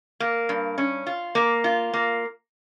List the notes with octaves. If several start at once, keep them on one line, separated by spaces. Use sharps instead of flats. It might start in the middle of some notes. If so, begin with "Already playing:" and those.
A#3
G2
C#4
F4
A#3
F4
A#3